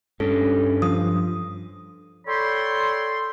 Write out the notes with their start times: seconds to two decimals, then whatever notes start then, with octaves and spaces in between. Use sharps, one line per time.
0.20 G2 C#4 A4
0.82 F3 D#6
2.27 A4 C#5 D5 G5 B5 C6